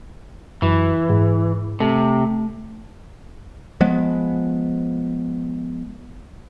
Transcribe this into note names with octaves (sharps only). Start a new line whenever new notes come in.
F#2 E3
G#2
C3 A3
F3 G#3 B3